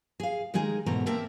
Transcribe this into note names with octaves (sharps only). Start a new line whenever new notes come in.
G#4 F5
D#3 G#3 D#4 G#4 A#4
E2 G#2 B2 A3 A#4 A#5
A#3 C4 A#4 E5 A5